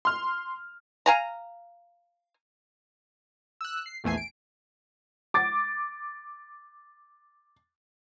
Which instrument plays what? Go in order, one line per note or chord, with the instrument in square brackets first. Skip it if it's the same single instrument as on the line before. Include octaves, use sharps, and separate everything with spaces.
[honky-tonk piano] C6 F6
[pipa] F5 G#5 A#5
[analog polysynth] E6 F#6
C7
A#1 E2 A3 G#5 C7
D7
[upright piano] D6 A6